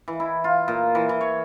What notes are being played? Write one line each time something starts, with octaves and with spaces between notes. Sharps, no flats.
E3
E4
F4
A#2
E3
E3
C#5